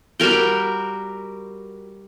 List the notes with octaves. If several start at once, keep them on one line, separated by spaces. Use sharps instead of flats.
G3 F#4 A#4 G5